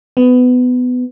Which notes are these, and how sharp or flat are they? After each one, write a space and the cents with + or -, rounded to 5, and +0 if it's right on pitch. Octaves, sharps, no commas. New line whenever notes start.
B3 +20